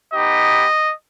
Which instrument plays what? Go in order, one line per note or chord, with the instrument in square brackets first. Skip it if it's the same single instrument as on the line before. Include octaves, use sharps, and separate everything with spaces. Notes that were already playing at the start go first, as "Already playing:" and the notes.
[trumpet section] B3 D#4 G4 D#5